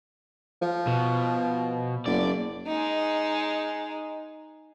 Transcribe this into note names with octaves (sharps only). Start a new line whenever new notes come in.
F3
B2
F#1 D5
G#3 D#4